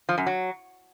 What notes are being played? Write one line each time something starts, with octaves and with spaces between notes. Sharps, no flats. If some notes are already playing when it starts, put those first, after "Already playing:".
F3
F#2
F#3